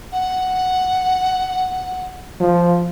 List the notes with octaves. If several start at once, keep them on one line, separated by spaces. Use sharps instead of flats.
F#5
F3